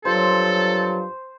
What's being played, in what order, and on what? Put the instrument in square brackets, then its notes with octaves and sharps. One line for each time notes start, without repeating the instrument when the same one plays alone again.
[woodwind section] G2 F3 F#3 [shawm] A4 [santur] C5